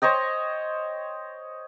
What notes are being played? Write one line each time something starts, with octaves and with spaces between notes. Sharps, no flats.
C5 C#5 D#5 G5